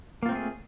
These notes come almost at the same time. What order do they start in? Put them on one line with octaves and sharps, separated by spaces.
A#3 F4 C4 A3 G#4